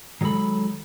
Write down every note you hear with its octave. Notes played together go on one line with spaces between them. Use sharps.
D#3 F#3 G#3 A4 B5